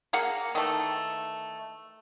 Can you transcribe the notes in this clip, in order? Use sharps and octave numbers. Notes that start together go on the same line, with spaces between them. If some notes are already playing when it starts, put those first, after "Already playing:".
A#3 G#4 F5 F#5
D#3 E3 A3